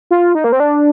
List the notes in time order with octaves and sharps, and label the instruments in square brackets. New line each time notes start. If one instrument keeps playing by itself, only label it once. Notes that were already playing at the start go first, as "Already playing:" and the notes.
[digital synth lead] F4
D#4
A#3
C4
D4